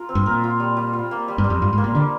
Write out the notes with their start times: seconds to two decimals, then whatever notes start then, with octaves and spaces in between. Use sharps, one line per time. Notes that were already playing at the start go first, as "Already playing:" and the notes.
Already playing: F4 A#4
0.09 C4
0.15 G2
0.26 A#2 A#4
0.44 F4
0.60 G3
0.77 G3
0.93 F4
1.11 A#3
1.28 G3
1.38 G2
1.44 G3
1.50 F2
1.62 G2 F4
1.73 G#2
1.78 A#3
1.84 A#2
1.95 D3 G3